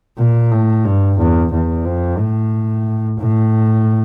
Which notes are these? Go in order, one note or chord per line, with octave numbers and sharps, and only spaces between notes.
A#2
A2
G2
E2
E2
F2
A2
A2